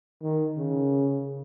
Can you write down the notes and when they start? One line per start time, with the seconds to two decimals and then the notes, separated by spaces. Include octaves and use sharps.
0.22 D#3
0.57 C#3